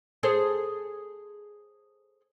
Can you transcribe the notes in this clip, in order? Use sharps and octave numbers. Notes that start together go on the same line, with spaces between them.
G#4 A4 C5